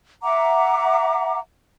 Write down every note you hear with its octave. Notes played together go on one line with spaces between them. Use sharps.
E5 F#5 A#5 D6